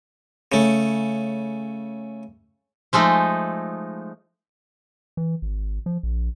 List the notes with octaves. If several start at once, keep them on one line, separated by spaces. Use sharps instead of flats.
C#3 A3
F3 G#3 A3 D#4
E3
G#1
F3
A#1